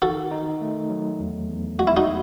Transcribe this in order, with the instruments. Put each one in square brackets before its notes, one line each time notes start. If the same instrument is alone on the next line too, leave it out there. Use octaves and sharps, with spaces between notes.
[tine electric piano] D#3 [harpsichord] F#4 A4
[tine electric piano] D#4
A3
F#3
E2
E2
[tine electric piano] G#3 [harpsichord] F#4
[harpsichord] E4
D#4 F#4